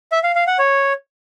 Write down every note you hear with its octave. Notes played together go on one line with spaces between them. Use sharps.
E5
F5
F5
F#5
C#5